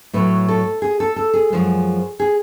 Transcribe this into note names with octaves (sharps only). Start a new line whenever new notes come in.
A2 F#3 B4
A4
G#4
A4
A4
G#4
F#2 F3 G#3
G#4